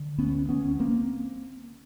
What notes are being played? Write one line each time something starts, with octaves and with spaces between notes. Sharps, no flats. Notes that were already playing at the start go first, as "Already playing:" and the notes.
Already playing: D3
D2 B3 C#4
B3 C#4
D2
A#3 C4